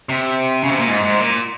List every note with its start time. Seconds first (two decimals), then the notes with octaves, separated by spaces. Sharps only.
0.09 C3
0.64 C#3
0.71 C3
0.79 A#2
0.88 G#2
1.04 G#2
1.20 A#2